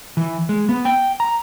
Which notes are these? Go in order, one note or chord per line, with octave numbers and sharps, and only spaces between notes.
E3
G#3
B3
G5
A#5